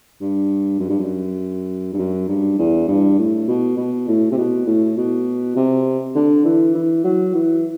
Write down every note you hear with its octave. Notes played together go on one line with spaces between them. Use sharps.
G2
F#2
G2
F#2
G2
F#2
G2
E2
G2
A2
B2
B2
A2
C3
B2
A2
B2
C3
D3
E3
E3
F#3
E3